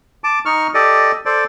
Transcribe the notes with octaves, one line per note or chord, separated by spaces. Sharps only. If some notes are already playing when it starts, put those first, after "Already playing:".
A5 D6
D#4 C#6 F6
G4 A4 D5 D#5
A4 C5 D5